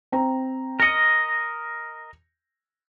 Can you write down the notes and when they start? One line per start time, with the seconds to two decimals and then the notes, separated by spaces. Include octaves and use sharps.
0.12 C4 A#5
0.80 A#4 D#5 A#6 C#7 D#7